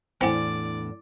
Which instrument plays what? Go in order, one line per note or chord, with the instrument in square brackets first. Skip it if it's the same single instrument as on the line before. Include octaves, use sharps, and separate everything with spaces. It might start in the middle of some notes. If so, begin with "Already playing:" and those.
[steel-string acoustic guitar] E2 A2 D4 [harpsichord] C4 [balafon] E4 F#5 G#5 [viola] D5